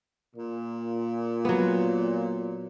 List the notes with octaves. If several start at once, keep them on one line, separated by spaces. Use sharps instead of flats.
A#2
F#3 B3